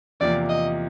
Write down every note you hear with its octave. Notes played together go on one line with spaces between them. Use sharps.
E2 C3 F3 A#3 D5
D#5